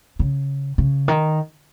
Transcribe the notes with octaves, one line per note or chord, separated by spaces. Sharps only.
C#3
C#3
D#3